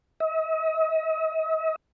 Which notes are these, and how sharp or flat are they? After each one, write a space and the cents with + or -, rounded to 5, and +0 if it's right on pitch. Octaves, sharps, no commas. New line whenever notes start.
D#5 +45